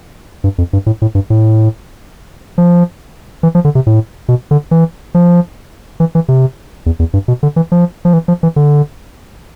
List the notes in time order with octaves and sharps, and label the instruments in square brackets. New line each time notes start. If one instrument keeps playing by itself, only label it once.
[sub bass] G2
F2
G2
A2
A2
G2
A2
F3
E3
F3
D3
C3
A2
B2
D3
E3
F3
E3
E3
C3
E2
E2
G2
B2
D3
E3
F3
F3
E3
F3
E3
D3